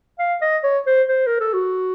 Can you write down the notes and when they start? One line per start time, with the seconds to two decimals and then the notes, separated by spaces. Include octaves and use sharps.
0.19 F5
0.42 D#5
0.64 C#5
0.87 C5
1.08 C5
1.27 A#4
1.40 A4
1.54 F#4